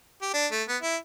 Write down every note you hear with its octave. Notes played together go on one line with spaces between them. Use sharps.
G4
D4
A3
B3
E4